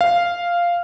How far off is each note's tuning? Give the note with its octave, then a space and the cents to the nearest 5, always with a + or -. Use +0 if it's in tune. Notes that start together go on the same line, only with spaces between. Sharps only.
F5 -5